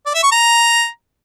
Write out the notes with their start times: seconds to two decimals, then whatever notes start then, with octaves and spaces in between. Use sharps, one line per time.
0.06 D5
0.15 E5
0.23 C#6
0.32 A#5